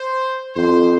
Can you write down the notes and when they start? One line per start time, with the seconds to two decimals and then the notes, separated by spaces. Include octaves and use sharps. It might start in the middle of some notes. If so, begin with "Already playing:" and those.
Already playing: C5
0.56 F2 C5